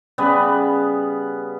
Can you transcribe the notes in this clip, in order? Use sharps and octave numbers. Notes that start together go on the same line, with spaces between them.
C#3 G3 B3 B4